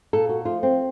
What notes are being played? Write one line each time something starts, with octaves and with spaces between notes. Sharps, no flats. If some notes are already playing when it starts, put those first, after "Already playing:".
A#2 A4
F#4
F3 A3 F4
C4